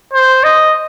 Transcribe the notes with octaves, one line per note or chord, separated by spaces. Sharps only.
C5
D#5